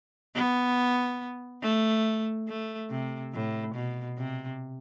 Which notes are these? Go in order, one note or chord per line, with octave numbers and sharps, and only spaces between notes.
B3
A3
A3
C3
A2
B2
C3